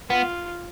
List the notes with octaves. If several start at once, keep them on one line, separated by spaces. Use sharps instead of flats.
B3 F4